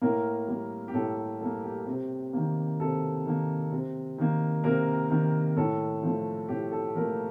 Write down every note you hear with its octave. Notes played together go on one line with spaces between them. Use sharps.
A2 A#3 A#4
G3 A#3
G4
A2 A4
G4
G3 A#3 A4
G4
C3 G4
D#3 A#3
C3 A4
D#3 A#3
C3
D#3 A#3
C3 A#3 A#4
D#3 A#3
A2 A4
F3 A3
A2 G4
A4
F3 A3 A#3 A#4